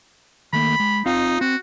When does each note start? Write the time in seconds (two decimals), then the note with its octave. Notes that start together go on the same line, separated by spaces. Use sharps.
0.53 D#3 A3 A#3 B5
0.80 G#3
1.06 C4 D#4 F4 F5
1.41 C4 F#4